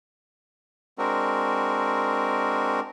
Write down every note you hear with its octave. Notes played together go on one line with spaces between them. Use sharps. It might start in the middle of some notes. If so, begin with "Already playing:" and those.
G#3 C4 D4 F#4 A#4